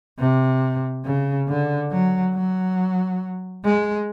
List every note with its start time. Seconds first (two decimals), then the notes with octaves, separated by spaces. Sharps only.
0.19 C3
1.05 C#3
1.48 D3
1.91 F#3
2.35 F#3
3.64 G#3